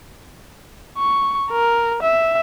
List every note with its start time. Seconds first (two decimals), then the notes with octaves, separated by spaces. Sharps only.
0.98 C#6
1.51 A#4
2.03 E5